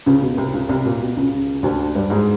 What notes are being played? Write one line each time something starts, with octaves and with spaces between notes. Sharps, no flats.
C#2 C#3
B2
C2 C3
C#2 C#3
C2 C3
A#2
B2
C#2 C#3
D2 D3
G2 G3
G#2 G#3